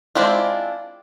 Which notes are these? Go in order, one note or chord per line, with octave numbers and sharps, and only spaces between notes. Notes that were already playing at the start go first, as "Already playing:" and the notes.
G#3 C4 D4 E4 F4